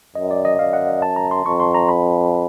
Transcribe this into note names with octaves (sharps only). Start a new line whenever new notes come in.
F#2 D#5
D5
D#5
F#2 F5
F#5
A5
A#5
C6
F2 C#6
C6
A#5
B5